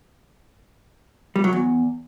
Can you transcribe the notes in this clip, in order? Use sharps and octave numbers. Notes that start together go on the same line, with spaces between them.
G3
F#3
E2